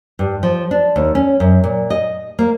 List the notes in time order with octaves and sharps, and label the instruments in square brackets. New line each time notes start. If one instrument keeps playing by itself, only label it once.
[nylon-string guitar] G2
F3
D4
D#2
C#4
F#2
A#2
D#5
A#3